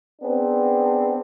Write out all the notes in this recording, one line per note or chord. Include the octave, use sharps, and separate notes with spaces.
B3 C4 D4 G#4